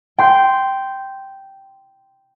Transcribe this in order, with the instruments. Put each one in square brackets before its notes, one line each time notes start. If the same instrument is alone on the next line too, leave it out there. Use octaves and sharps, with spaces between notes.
[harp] G5 C6 G6